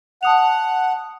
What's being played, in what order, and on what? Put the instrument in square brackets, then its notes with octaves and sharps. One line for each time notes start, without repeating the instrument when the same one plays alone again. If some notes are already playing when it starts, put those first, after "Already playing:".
[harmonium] F#5 [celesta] A5 D#6 F7